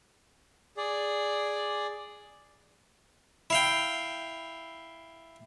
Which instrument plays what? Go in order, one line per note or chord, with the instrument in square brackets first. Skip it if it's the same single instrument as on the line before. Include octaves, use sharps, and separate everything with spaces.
[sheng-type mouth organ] G#4 D5
[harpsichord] E4 F5 G5